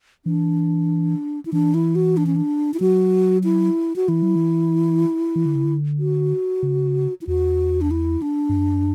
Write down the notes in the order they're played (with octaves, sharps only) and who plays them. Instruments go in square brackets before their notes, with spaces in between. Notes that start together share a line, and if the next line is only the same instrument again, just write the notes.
[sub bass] E3 [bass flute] D4
[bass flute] E4
[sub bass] E3 [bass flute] D4
[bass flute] E4
F#4
D4
C#4
D4
E4
[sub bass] F#3 [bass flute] F#4
[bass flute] E4
F#4
[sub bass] E3 [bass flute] E4
[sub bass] F#3
E3
E3
D3
C#3
D3
[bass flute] F#4
[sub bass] C#3
[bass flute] E4
[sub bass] E2 [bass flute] F#4
[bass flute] D4
E4
D4
[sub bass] G2
F#2